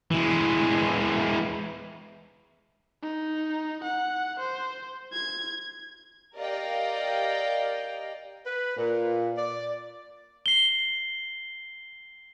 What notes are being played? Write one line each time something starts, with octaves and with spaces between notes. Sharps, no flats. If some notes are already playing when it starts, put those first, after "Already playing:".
E3 G#3
D#4
F#5
C5
G#6
G4 A#4 D5 D#5 F5 G5
B4
A#2
D5
C7 G7